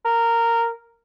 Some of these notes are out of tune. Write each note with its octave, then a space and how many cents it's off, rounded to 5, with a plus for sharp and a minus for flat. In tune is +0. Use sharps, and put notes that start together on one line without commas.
A#4 -10